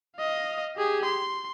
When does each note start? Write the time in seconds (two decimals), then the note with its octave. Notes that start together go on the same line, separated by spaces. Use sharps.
0.17 D#5 F5
0.77 G4 G#4
1.05 C6